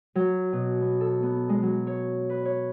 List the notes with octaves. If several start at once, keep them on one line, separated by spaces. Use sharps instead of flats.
F#3
B2
B3
A4
B3
G#3
F#3
C#5
B4
C#5